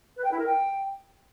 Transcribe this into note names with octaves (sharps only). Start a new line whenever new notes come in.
B4
G5
E4
A#4
G5